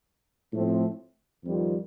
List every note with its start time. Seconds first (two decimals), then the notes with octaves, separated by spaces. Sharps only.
0.53 A2 F3 A3 C4
1.44 F2 D#3 G3 C4 F4